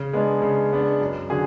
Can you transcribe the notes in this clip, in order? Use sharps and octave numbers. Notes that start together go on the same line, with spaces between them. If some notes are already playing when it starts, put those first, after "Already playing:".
Already playing: C#3
G#3 B3 D4
C#3
G#3 B3 D4
F#2
D3 F#3 C#4 G#4